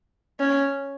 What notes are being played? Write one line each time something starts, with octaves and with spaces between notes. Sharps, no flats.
C#4